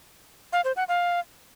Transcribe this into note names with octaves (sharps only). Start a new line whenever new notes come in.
F5
C5
F#5
F5